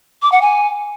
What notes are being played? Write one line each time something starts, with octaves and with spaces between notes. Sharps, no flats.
D6
F#5
G#5